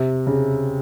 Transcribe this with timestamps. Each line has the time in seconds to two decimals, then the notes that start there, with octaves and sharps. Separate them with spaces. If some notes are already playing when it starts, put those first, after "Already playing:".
Already playing: C3
0.27 C#3